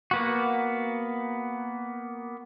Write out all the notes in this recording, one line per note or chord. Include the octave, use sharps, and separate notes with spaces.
A#3 B3 F#4